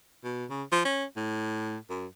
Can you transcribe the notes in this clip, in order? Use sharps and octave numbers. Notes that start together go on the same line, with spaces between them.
B2
C#3
F3
C#4
A2
F#2